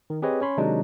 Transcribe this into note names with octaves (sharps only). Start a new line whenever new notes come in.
D#3
C4 G4 G#4 B4 C#5 D#5
C#4 C#5 B5 C6
C3 D#3 F#3 G#3 D4 D#4